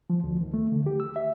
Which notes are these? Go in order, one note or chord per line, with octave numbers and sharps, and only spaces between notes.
F3
D2
D#3
A3
D3
G4
E6
E5